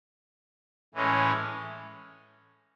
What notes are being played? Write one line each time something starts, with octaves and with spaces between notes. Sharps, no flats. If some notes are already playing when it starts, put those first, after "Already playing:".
A2 E3 G#3 C#4